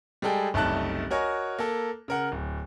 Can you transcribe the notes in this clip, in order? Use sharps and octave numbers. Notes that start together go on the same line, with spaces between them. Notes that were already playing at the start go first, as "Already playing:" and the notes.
G3 G#3 G#4 A4 G5
F#1 C2 A3 D#4 A5 F#6
F#4 A#4 C#5 D#5 G#5
A#3 A4
C#3 A#4 F#5
D1